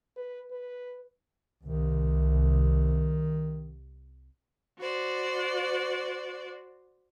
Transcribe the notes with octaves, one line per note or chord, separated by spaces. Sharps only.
B4
B4
C2 D#3
F#4 C5 D5